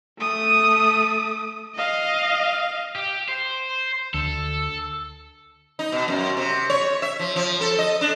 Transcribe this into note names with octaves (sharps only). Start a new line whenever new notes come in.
A3 D#6
D#5 F5
G4
C5
D2 A4
D#4
B2
F#2
C3
C#5
E5
F3
F3
A4
D#5
D4